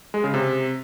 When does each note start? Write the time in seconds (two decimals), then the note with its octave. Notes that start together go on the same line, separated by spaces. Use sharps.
0.14 G#3
0.24 C#3
0.34 C3